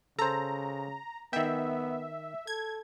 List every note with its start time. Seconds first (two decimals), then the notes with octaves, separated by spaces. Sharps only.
0.19 C#3 A4 C5 A#5
1.33 D#3 B3 E5 G5
2.47 A4 G#6